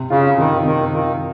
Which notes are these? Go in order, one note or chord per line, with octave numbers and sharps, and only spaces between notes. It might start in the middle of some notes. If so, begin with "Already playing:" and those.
Already playing: C3
C#3 F4
C3 D#3
D#3 C4
D#3 F4